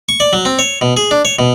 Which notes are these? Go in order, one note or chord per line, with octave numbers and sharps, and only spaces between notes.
C#6
D5
F#3
C4
C#5
B2
G#4
D4
C#5
B2